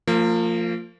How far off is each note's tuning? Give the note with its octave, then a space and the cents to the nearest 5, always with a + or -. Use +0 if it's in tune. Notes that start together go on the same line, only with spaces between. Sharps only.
F3 +0 A#3 -35